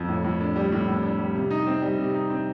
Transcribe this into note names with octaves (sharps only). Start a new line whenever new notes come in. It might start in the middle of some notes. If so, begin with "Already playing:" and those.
Already playing: F2
A2
A2
D4
G3
A2
A2
D4
G3
C3
D#4
C4
G3
C3
D#4
C4